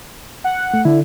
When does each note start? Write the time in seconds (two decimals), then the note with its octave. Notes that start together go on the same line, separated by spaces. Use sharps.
0.44 F#5
0.74 A3
0.85 D3 E4